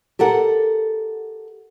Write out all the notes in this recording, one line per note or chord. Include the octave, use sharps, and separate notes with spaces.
G4 A4 A#4 F#5